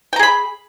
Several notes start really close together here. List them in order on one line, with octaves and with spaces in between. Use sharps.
G5 A#5 G#4 B5